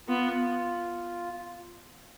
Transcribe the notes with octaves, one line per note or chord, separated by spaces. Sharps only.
B3 F4